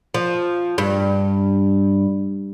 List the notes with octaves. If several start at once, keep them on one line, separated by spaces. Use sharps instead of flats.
F3
G2